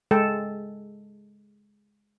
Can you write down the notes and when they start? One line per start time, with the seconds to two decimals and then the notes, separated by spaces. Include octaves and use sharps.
0.11 G#3 A4 G5